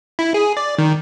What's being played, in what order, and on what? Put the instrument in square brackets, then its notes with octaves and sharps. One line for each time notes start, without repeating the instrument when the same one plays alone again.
[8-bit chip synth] E4
G#4
D5
D#3